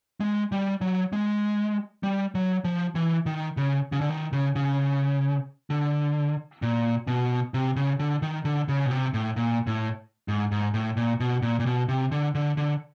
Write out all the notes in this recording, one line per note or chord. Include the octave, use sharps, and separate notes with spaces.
G#3
G3
F#3
G#3
G3
F#3
F3
E3
D#3
C#3
C#3
D3
D#3
C#3
C#3
D3
A#2
B2
C3
C#3
D3
D#3
D3
C#3
B2
C3
A2
A#2
A2
G#2
G#2
A2
A#2
B2
A#2
A#2
B2
C3
D3
D3
D3